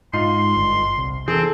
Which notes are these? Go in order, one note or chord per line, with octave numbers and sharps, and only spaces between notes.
G#2 F4 D#5 C6 C7
G1
C2
E2 C4 G#4 A4